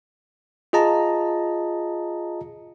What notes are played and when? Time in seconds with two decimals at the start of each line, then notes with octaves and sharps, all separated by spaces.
0.73 F4 G#4 D#5 A5 A#5